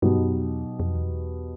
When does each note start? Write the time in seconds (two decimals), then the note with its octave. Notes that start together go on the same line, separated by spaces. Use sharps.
0.02 G2 B2 F#3 B3 D#4 G4
0.18 F#2
0.34 F2
0.49 E2
0.80 F2
0.95 E2
1.03 F2
1.11 E2